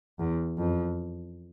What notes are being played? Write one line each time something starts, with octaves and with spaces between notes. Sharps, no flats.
E2
F2